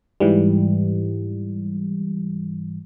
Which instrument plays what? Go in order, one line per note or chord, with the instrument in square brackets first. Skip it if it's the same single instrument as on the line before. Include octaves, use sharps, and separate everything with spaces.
[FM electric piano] G#2 E3 G3